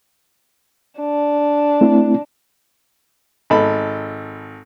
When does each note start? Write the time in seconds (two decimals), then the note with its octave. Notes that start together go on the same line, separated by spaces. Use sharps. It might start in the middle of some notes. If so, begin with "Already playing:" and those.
0.99 D4
1.81 A3 C4 E4
3.50 G#1 A4 B5